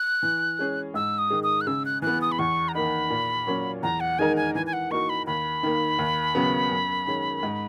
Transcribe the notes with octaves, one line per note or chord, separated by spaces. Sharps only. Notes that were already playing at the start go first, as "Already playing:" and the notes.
Already playing: F#6
E3
G#3 C#4 G#4
G#2 E6
D#6
D#3 G#3
D#6
F#6
C#3 E6
F#6
E3 B3 F#6
D#6
B5
E2 C#6
A#5
D#3 A#3 D#4 B5
A#2
F#3 A#3 C#4
E2 A#5
F#5
D#3 G#3 D#4 A#4 G#5
G#5
E3 G#5
G#5
F#5
A#3 D#4 F#4 A#4 C#6
B5
D#2 B5
D#3 A#3
D#2
C#3 F#3 B3
F#2
D#3 G#3 C#4
G#2